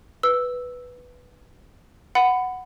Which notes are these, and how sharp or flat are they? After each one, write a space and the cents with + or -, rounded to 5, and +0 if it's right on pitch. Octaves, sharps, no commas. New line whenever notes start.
B4 +0 E6 +0
F#5 +0 B5 +20